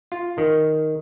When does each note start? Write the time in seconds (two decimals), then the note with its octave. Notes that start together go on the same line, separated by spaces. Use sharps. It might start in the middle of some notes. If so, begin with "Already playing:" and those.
0.12 F4
0.38 D#3